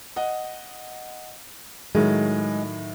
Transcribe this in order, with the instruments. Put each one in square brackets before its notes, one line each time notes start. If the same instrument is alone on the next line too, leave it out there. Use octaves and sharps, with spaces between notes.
[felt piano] D#5 F#5
[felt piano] A2 D#3 F#3 [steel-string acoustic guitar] G#3